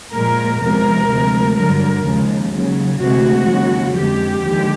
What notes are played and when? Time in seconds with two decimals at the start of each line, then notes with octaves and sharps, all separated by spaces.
0.13 A#2 F3 G#3 A#4
0.61 E2 C3 F3 G#3 A#4
1.09 D2 C3 F3 G#3
1.57 G2 D3 F#3 A#4
2.05 D#2 C#3 F3 G#3
2.53 D#2 C#3 F#3
3.00 D2 C3 E3 G#3 F#4
3.49 D#2 C#3 F#3
3.96 F2 D3 F3 G#3 G4
4.44 D#2 D3 F3 G#3